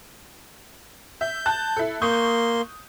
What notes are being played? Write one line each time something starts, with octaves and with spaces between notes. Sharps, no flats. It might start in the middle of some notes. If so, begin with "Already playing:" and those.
E5 G6
A5 F#6
E4 A4
A#3 C6 C#6 D#6 G6